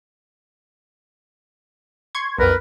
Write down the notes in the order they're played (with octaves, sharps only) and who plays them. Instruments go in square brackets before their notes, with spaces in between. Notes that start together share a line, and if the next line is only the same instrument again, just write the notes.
[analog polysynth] C6 C#6 G#6
[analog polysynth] B1 F2 [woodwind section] A#4 B4